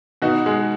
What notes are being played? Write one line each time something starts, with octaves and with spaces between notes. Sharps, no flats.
B2 D#4 F#4
G#3